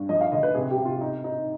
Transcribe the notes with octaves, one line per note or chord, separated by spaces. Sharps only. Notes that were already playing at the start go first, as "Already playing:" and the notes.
Already playing: G2
F3 D#5
F5
D2 D#5
B4
C3 G#4
G4
C3
F4
G#2 D#4
G#2 D#4